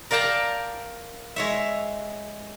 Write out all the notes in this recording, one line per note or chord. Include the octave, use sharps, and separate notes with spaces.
A#4 D5 F5 G5 A5 A#5
G#3 C#5 E5